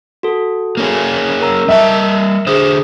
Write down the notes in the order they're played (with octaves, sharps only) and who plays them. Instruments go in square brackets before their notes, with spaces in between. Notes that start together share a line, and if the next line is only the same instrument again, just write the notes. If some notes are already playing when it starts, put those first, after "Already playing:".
[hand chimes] F#4 A4
[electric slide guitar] A#3 C#4 G#4
[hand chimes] A#4 A#5 E6
[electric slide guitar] G3 D#5 A5 [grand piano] E5
[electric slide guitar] D3 C5 [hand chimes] G#4 D#6